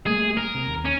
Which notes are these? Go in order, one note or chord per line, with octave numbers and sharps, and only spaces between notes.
G3 A3 A#3 G#4
A#4
C3
D#2
C#4